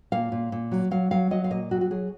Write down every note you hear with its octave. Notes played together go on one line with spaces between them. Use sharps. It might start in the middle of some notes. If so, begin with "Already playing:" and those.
A#2 F5
A#2
A#2
F#3
F#3 F5
F#3 F5
F#3 D#5
F5
A#2 D#5
F#3 F#4
F#4
F#3 G#4